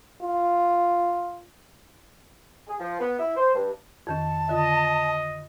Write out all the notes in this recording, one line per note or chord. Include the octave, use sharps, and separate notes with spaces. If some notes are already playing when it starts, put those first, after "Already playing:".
F4
G#4
F3
B3
E4
C5
G2
F2 D#3 C#4 A5
D3 F4 D#5